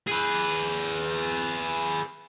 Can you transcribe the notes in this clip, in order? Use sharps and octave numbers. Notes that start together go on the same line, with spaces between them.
G#4 B4